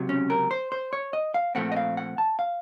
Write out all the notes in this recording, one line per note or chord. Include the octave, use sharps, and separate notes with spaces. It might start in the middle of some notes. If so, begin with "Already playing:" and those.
Already playing: C#2 C3 F#3
C#4
A#4
C5
C5
C#5
D#5
F5
A#2 F3 A3 C4 F#5
D#5
F5
F#5
A5
F5